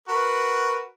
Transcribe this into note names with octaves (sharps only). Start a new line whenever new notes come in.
F#4 A#4 B4